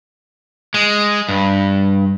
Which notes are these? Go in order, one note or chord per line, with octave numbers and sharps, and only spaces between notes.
G#3
G2